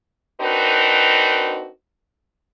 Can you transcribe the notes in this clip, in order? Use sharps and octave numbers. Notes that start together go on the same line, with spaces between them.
C4 D4 D#4 F#4 A#4 B4